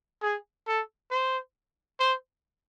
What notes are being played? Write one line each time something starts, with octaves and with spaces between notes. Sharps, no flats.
G#4
A4
C5
C5